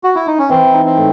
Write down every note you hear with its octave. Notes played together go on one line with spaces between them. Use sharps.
F#4
E4
D#4
C#4
E3 C4
D#4
C4
A2